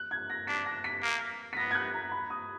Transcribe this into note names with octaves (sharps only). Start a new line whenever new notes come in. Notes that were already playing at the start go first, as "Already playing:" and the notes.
Already playing: F#6
G#6
A#6
D4 B6
A#6
B6
A#3
B6
B3 A#6
G#6
F#6
A#5
B5
D#6